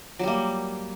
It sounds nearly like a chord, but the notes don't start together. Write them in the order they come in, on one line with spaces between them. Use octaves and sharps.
F#3 G3 A#3